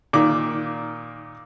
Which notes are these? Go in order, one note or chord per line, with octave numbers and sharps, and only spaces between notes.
A#2 D#3 D6